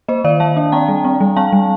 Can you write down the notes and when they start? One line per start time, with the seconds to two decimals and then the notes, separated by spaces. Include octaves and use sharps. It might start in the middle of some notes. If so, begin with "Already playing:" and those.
0.08 A#3 C5 D#5
0.24 D#3 D5 F5
0.40 D#3 F5 A5
0.57 D4
0.72 C4 G5 A#5
0.88 G3
1.05 C4
1.21 G3
1.36 C4 F5 A5
1.53 G3